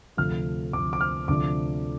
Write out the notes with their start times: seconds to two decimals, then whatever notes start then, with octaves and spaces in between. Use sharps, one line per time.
0.17 D2 C3 F3 F6
0.73 D2 C3 F3 D6
0.93 D6
1.01 F6
1.28 D2 C3 F3 D4 D6